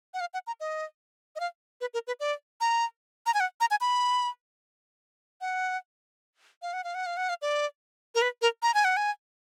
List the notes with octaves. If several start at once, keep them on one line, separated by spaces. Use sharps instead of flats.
F#5
F5
F#5
A#5
D#5
D#5
F5
B4
A#4
B4
D5
A#5
A#5
G#5
F#5
A#5
G#5
B5
F#5
F5
F#5
F5
F#5
F5
F#5
F5
D5
A#4
B4
A#4
A#5
G#5
F#5
G#5